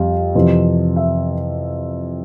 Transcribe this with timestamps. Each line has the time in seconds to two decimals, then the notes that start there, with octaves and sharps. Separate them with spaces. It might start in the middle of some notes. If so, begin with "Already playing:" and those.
Already playing: F2 G3 F5
0.35 F2 C3 E3
0.96 E5